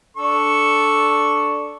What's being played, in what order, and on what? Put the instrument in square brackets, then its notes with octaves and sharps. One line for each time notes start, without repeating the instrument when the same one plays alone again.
[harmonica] D4 A4 C#6